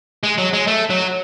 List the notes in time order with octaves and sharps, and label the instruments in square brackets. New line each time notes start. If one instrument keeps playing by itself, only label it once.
[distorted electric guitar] G#3
F#3
G#3
A3
F#3